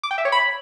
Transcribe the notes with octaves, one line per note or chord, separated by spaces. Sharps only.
D6
G5
E5
C#5
B5